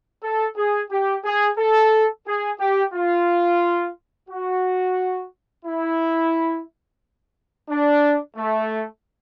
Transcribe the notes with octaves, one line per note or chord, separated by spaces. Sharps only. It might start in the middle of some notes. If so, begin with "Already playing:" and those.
A4
G#4
G4
G#4
A4
G#4
G4
F4
F#4
E4
D4
A3